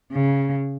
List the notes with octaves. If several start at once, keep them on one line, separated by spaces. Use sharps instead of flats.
C#3